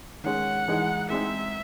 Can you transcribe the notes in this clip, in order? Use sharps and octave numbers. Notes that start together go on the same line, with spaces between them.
D#3 G#3 C#4 G#4 F#5
E3 G#3 D#4 G#4
G#3 C4 D#4 G#4 E5